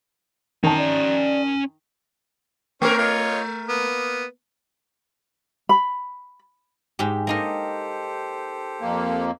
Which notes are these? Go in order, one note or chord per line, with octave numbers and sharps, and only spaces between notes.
D#3 C#4 A5 A#5
D5
A3 C#4 A#4 C5
F4 C#5 D#5
A#3 B3
B5
G#2 G4
A#3 D#4 G4 A4 A#4 C5
F2 A#3